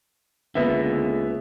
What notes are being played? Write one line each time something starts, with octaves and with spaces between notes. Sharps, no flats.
C#2 D3 A#3 B3 E5